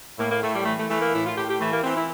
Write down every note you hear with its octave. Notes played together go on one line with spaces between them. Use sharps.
A2 A#3
A#3
A2 A3
G3
E3 A3
A3
E3 A3
A#3
A2 E4
F4
A2 G4
G4
E3 A3
A#3
E3 C4
E4